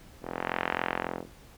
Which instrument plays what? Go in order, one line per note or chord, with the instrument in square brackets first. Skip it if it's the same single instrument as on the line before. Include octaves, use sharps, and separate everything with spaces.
[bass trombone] F1